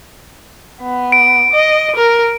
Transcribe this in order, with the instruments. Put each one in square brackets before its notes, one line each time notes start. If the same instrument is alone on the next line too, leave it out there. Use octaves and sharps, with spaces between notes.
[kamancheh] B3
[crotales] D7
[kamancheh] D#5
A#4